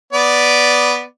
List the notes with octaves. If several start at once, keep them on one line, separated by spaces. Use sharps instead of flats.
B3 D5